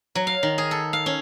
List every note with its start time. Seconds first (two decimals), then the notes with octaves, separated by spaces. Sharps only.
0.15 F#3
0.27 F5
0.43 D#3
0.58 G#4
0.71 A4
0.93 F5
1.06 C#4